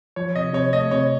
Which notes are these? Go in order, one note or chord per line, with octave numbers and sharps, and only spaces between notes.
F3 C#5
C3 D#5
C3 C#5
A3 D#5
C3 C#5